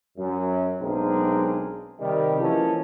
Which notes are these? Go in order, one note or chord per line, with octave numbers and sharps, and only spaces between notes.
F#2
B1 G#3 C4 D4 G#4 A#4
C3 D#3 G3
E3 F3 G#3 A#3 C#4 A4